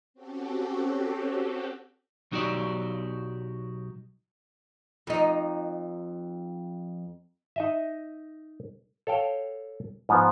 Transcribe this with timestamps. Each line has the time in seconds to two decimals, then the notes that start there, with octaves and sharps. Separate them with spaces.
0.14 C4 C#4 F#4 G4 A4
2.32 B1 F#3 D#4 F#4 G4 D5
5.07 F2 D#4
7.56 D#4 D#5 E5
9.07 A4 C#5 F5 G5
10.09 G#2 F3 B3